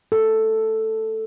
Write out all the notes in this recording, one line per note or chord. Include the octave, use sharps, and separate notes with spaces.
A4